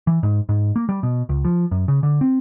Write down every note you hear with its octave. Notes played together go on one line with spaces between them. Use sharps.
E3
G#2
G#2
A#3
G3
B2
C#2
F3
F#2
C#3
D3
C4